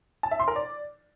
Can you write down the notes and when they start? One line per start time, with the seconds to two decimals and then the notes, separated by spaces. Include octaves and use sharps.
0.23 A5
0.31 E5
0.40 C6
0.48 A#4
0.56 D5